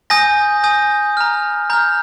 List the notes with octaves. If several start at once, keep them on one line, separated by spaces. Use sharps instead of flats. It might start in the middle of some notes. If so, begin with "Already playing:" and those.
G#5 D#6 G6 A#6
G#5 D#6 G6
A#5 F6
A#5 F6 G6